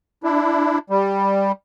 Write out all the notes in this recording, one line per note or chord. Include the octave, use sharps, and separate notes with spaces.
D4 E4
G3